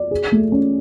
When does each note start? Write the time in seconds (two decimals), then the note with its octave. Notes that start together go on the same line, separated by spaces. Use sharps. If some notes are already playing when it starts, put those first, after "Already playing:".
Already playing: D5
0.11 G#4
0.32 A3
0.52 C#4